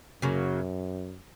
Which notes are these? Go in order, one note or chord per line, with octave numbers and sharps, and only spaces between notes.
F#2 C#3 F#3 A#3